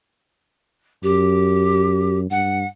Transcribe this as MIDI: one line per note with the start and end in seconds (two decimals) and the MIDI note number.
1.03 2.27 42
1.03 2.18 67
2.31 2.64 43
2.31 2.67 78